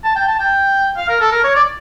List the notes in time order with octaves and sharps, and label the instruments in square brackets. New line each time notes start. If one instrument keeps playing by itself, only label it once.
[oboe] A5
G5
A5
G5
F5
A#4
A4
A#4
C#5
D5